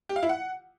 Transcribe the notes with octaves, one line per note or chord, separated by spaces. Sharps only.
G4
F5
E4
F#5